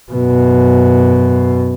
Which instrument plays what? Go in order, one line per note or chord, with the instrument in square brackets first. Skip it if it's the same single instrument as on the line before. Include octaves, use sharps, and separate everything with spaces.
[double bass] F#2 B2